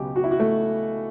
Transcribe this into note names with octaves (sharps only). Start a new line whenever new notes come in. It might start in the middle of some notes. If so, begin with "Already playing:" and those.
Already playing: C#2 B2 F#3 G4
F#4
E4
F#4
A3